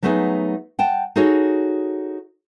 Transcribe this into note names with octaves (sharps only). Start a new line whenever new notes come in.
F#3 A3 B3 D#4 G4 G#4
F#5 G5 A5
D#4 F#4 G#4 A4 C#5